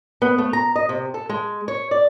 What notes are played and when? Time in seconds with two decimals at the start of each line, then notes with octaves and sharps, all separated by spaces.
0.22 B3
0.38 A3
0.53 A#5
0.76 D#5
0.89 C3
1.14 A4
1.29 G#3
1.68 C#5
1.91 D5